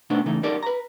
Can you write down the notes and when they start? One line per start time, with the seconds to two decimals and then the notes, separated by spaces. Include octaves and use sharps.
0.10 B2 A3 B3 C4 D4 D#4
0.26 C#3 E3 A3 D#4
0.43 D#4 G4 A4 A#4 D5
0.63 B4 A#5